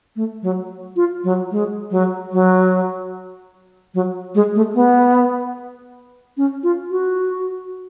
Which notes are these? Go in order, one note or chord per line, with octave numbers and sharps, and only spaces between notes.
A3
F#3
F4
F#3
G#3
F#3
F#3
F#3
G#3
A3
B3
C#4
F4
F#4